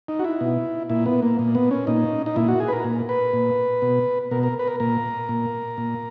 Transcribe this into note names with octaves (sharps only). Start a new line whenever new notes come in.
D#4
F#4
E4
B2
A#2 E4
B3
A#3
A#2
B3
C#4
A#2 D#4
D#4
A#2 E4
F#4
G#4
B4
A#4
A#2
B4
A#2
B2
B2 A#4
A#4
B4
A#4
A#2 A#4
A#2
A#2